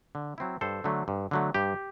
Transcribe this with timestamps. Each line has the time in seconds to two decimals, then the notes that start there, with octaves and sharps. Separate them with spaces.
0.15 D3
0.38 F#3 C4 E4
0.61 G2 A4 C5
0.84 D3 F#3 A3
1.08 G2
1.31 D3 F#3 A3
1.54 G2 G4